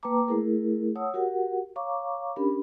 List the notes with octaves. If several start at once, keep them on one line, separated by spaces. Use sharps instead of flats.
A#3 B4 G5 A5 A#5 D6
A3 E4 G#4 A#4
C#5 F#5 A5 D#6 E6
F#4 G4 A#4 F#5
C#5 F5 A#5 C#6 D6
C#4 D4 G4 A#4 B5